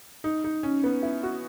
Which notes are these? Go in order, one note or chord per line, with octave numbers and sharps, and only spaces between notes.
D#4
D#4
C#4
B3
E4
F#4